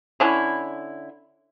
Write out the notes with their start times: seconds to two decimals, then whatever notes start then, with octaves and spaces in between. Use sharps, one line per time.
0.20 D3 C#4 E4